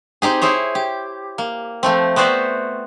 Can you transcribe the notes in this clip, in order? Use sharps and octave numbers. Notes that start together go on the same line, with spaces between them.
C4 D#4 G4 G#4
E4 G#4 C5 C#5
G4
A#3
F3 A3 C4
B3 C4 F#4 C5 D5 E5